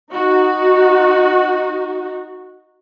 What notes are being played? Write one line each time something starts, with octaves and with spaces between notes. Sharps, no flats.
D#4 F#4